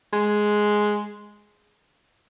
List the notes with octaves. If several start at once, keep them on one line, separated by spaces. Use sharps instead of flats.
G#3